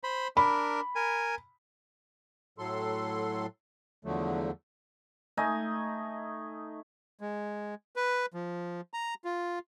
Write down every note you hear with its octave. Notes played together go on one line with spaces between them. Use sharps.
C5 B5
D4 A#4 B5
A#4 G#5
A2 F#3 A4 C6
E2 D3 F3 F#3 A3
A3 D#4 D#5 G#5
G#3
B4
F3
A#5
F4